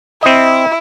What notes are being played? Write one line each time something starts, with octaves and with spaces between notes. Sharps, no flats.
C4 E4 D#5